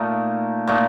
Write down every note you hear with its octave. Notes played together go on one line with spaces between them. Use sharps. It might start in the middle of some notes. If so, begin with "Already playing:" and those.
Already playing: A#2 A3 D#4
A#2 A3 D#4